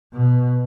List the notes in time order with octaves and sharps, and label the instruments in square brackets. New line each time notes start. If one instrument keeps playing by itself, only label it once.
[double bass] B2